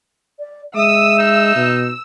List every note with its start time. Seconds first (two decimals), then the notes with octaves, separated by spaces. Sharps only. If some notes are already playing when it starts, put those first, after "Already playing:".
0.39 D5
0.76 G#3 E5 D#6 E6
1.19 D#4
1.56 B2